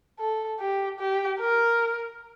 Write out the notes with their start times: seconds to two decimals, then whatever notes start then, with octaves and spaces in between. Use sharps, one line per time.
0.19 A4
0.60 G4
0.99 G4
1.40 A#4